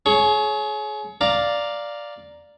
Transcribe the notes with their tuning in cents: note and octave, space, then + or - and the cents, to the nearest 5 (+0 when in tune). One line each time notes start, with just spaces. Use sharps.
G#4 +35 C#5 +0 C#6 +0
D5 +0 F5 +0 A#5 +0